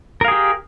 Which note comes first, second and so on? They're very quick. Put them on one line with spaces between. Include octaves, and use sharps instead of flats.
A#4 F5 G#4 G4